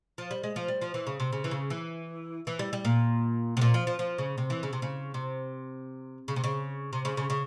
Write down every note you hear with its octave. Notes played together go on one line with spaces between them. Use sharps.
F3
G3
G#3
F3
G3
F3
E3
C#3
C3
C#3
E3
C#3
E3
E3
G3
G3
A#2
C3
A#2
F3
F3
F3
C#3
C3
E3
C#3
C3
C#3
C3
C#3
C3
C#3
C3
C#3
C#3
C#3